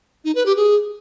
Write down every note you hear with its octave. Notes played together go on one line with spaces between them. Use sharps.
D#4
B4
G4
G#4